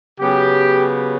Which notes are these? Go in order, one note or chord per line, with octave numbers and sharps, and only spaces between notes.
C#3 F#3 B3 G4